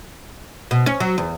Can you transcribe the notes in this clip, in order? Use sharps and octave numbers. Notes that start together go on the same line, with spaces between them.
B2
C#4
F#3
E2